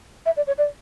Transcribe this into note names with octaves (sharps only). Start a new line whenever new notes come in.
E5
D5
C#5
D5